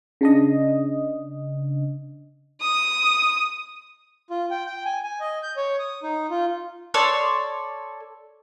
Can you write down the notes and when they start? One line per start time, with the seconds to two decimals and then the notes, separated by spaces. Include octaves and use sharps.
0.21 C#3 D4 D#5
2.61 D#6
4.30 F4
4.51 G5
4.66 G5
4.85 G#5
5.03 G#5
5.20 D#5
5.43 G6
5.57 C#5
5.79 D#6
6.03 D#4
6.30 F4
6.94 A4 C#5 D5 C6